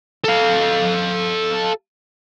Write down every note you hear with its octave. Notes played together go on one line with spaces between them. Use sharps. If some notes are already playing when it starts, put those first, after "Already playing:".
A4 F5